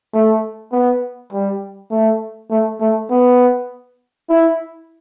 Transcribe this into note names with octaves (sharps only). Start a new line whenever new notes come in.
A3
B3
G3
A3
A3
A3
B3
E4